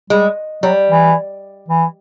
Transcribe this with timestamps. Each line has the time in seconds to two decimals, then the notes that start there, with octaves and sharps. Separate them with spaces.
0.10 G3 G#3
0.63 F#3 G3
0.90 E3
1.68 E3